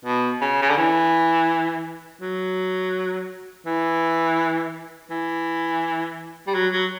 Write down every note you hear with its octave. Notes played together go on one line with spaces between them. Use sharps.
B2
C#3
C#3
D3
E3
F#3
E3
E3
G3
F#3
F#3